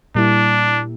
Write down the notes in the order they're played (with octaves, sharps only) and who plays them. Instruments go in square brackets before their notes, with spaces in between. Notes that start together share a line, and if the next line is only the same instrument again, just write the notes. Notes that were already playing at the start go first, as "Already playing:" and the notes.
[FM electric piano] A#2 G3 A#3 E4 [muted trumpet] D4